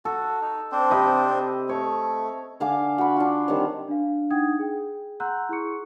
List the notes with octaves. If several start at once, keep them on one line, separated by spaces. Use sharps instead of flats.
F#4 A4
D#4
C4 D4 C5
C3 D#5 B5
A3 C#5
D3 F5 G#5 D6
F#4 B5
D4 F4
D#3 G3 C4 C#5
D4 F5
D4 D#4 F#5 G5 D#6 G#6
G#4 G5
F#5 A#5 C6 E6 F#6 G6
E4 G#4 C6 C#6 C#7